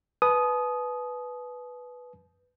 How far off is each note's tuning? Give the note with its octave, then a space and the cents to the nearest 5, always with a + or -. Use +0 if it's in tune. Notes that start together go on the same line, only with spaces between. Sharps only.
B4 +0 A5 -45 D#6 +0